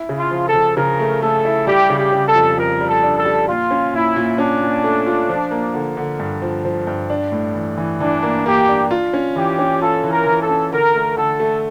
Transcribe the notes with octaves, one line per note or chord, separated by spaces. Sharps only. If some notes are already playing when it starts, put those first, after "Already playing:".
Already playing: E4
C#3
F4
F3
A4
F3
C#3 A#4
A3
A3 A4
E4
G3 G4
C#3
G4
C#3
A4
F2
F2 A#4
G3
A4
D4
A4
G3
A#2 F4
C#4
A#2 E4
A#2
C#4 D4
A#2
A3
F4
F3
A#3
D3
D3
G2
F3
F3
G2
D4
A2
E3
E3
E3 D4
A#3
A#3 G4
D4
F4
C#4
E3 G4
C#4
F4 A4
E3
A#4
E3
A4
C#4
D3 A#4
A3
D3 A4
A3